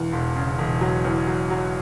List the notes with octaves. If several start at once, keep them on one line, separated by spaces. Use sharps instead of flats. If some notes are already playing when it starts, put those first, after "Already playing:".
Already playing: E1 E2
E1
C#3
E1
F#3
E2
F#3
F#3